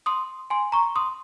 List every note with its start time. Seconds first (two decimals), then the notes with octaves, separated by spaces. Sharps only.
0.06 C6 D#6
0.50 G#5 C6
0.72 A#5 C#6
0.96 C6 D#6